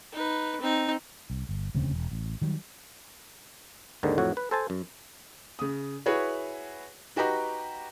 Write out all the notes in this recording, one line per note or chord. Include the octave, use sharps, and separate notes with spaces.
D#4 B4
C4 D#4
C2
G1
E1 D2 C#3 C4
E1
A1
D#3 F#3 G3
D#2 G#2 D3 D#3
F2 A2 F#3 F#4 C#5
B4
A4 C5 G#5 A5
F#2
C#3 D#6
E4 F#4 G#4 B4 C#5
D#4 F#4 G4 B4 G5 A#5